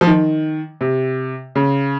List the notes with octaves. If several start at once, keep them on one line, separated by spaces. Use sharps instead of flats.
F3
D#3
C3
C#3